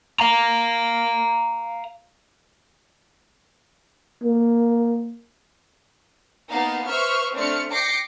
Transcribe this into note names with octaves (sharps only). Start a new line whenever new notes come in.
F5 A#5
A#3
A#3 B3 D#4 F5 A5
B4 C5 E5 C#6 F6
A3 C4 D4 F6 C#7
G5 D6 A#6 C7 C#7